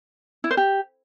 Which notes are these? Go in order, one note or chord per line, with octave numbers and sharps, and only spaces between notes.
E4
C5
G4